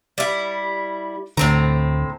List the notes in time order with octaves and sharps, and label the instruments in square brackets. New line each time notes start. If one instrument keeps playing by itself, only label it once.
[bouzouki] G3 E4
[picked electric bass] D2 D3 [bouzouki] A2 C4 A#5